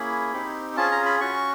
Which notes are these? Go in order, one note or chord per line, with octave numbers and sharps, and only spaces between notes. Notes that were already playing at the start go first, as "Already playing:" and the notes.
Already playing: A#3 C#4 E4 G#4 B5
C4 D#4 G4
C#4 F4 G#4 A5
A#5
B5
C#4 F#4 C#6